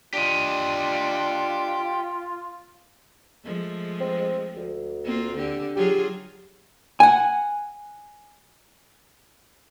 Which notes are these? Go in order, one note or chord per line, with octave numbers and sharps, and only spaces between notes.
D4 F4 G4 D#5
F3 G#3 A3
C4
D2
A#3 C4 F4
D3 G4
F#3 F4 G4 G#4
F#5 G#5